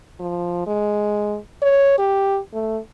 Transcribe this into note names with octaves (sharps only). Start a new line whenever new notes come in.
F3
G#3
C#5
G4
A3